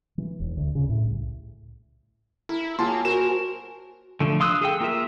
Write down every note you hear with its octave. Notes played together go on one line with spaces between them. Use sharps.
E3
E1
D2
C#3
A2
C2
E4 A#4
F#3 A#3 F4 G#4 A5 C6
F#4 A#4 C5 G#5 E7
D3 F3 A3
F5 C6 D#6 E6 F#6
G#4 A4 F5 G5
A#3 F4 A#4 E5